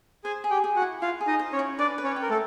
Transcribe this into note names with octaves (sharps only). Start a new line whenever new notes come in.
G#4 C5 G#5
G#4
G4 G5
G#4
F#4 F#5
E4
E4 F4 F5
G#4
D#4 D#5
C5
C#4 C#5
E4
D4 B4 D5
B4
C#4 C#5
G5
A#4
A3 A4